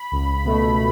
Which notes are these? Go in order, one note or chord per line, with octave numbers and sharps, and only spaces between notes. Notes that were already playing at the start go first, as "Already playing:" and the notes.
Already playing: B5
C#2
B2 A3